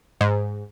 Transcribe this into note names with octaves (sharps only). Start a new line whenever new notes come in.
G#2